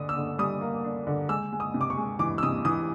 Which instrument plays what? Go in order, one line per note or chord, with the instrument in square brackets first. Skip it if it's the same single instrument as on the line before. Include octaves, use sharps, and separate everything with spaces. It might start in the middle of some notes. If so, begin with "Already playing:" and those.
Already playing: [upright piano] D3 D4 D#6
E6
D3
G3 D#6
A#3
D4
D3
G#3 E6
G#3
D#6
C3
D6
C#6
G#3
E3 D6
E6
C3 D#6
E3 D#6